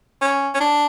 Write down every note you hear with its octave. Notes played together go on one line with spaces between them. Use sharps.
C#4
C#4
D4